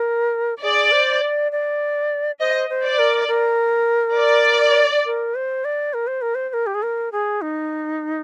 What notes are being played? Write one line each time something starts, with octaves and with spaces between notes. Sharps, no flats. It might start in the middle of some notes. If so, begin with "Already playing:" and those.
Already playing: A#4
G#4 D5
C5
D5
D5
C5 D#5
C5
D5
A#4
A#4
D5
A#4
C5
D5
A#4
C5
A#4
C5
C5
A#4
G4
G#4
A#4
G#4
D#4